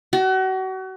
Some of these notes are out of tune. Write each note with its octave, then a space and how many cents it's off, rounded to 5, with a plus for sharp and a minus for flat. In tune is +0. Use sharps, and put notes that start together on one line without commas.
F#4 +35